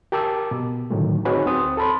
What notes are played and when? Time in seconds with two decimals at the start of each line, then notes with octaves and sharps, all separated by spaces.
0.12 G4 A#4 A5 D6 E6
0.51 B2
0.90 A2 D3 D#3 F#3 A3
1.25 C4 D#4 F#4 G#4 B4 C#5
1.45 D2 C4 C5 D#6
1.77 A4 A5 B5 C6